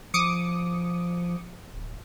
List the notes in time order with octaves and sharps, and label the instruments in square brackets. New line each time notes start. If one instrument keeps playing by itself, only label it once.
[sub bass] F3 [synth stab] D6 D#6 C#7
[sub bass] D1